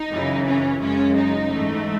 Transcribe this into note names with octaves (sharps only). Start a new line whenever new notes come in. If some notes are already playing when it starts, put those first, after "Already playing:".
Already playing: D#4
F#2 C#3 E3
C#4
F#2 C#3 G#3 C#4
D#4
G#2 E3 A3